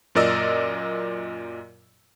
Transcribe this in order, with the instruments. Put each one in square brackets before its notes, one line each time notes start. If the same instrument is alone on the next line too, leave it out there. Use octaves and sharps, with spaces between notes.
[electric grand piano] F#2 A#2 A#4 D5 D#5 E6